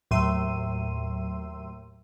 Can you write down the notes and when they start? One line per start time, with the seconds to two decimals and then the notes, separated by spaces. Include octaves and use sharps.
0.11 D#2 A2 F#3 C6 E6 D#7